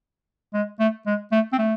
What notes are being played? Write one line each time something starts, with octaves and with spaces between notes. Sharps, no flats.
G#3
A3
G#3
A3
C4
A3